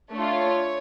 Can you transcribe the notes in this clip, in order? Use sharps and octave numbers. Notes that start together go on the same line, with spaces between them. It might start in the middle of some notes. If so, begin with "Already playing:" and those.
A3 D4 F4 C#5